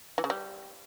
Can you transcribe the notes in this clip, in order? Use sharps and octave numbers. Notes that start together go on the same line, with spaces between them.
E3
C#3
G3